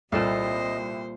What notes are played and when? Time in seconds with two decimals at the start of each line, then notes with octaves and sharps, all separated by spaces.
0.12 C2 A#2 G3 A4 C5 D#5 F5